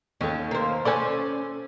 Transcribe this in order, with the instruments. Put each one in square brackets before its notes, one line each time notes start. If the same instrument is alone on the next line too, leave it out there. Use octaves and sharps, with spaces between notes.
[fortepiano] D#2 [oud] C#4 A4
[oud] A#3 C5
[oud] C#4 A4 C5 [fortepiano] D5 G#5